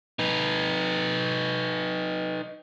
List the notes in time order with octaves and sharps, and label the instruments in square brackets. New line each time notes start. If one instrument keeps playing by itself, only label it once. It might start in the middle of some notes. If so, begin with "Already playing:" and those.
[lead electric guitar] D#4 B4